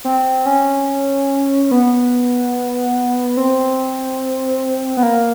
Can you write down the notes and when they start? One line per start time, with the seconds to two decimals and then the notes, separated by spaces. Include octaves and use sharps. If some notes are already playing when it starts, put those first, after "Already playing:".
0.05 C4
0.46 C#4
1.71 B3
3.37 C4
4.97 B3
5.03 A#3